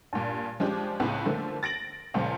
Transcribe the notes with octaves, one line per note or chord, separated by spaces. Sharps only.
G2 A#2
F3 G#3 C#4 D4 G4
C#2 A2 B3
D3 F3 A3 A#3
A6 A#6 D7 F#7
C#2 A#2 F3